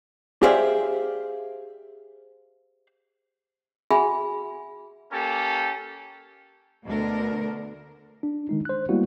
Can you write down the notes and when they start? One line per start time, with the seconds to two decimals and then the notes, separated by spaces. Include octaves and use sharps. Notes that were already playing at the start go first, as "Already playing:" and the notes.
0.43 G4 G#4 C5 D5 E5 F5
3.91 F#4 G#4 E5 F#5 G#5 B5
5.13 A#3 C#4 G4 A4
6.86 D2 B2 D4 A4 A#4
8.23 D4
8.49 D#3 G#3 D#4
8.65 C5 F#6
8.89 G3 G#3 A#3 B3 E4 F#4